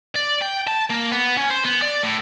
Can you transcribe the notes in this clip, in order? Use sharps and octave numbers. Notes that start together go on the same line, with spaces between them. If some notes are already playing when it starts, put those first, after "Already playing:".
D5
G5
A5
A#3
B3
C#4
C5
B3
D5
A2